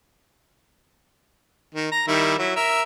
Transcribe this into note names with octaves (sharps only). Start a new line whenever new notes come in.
D#3
A#5
D#3 G3 E4
F#3 E4
A#4 E5